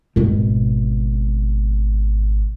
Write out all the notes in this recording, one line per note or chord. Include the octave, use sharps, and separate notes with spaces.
G#1 B2